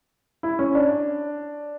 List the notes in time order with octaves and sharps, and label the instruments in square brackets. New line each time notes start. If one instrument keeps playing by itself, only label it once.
[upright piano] E4
C#4
D4